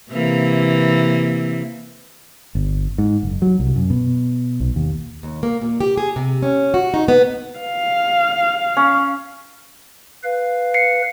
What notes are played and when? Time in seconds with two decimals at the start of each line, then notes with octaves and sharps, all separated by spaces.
0.11 C3 E3 A#3
2.55 G1
2.98 G#2
3.23 F#1
3.42 F#3
3.60 C2
3.76 F#2
3.90 B2
4.60 B1
4.76 D#2
5.23 D#2
5.43 A#3
5.62 A#2
5.81 G4
5.97 G#4
6.16 C3
6.42 C#4
6.74 F#4
6.94 D#4
7.08 B3
7.59 F5
8.77 C#4
10.23 B4 F5
10.74 C7 C#7